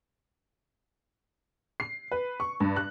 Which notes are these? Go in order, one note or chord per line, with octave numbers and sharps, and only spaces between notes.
C7
B4
C#6
G2
F#6